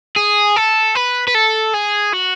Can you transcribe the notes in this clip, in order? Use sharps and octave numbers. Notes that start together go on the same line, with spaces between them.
G#4
A4
B4
B4
A4
G#4
F#4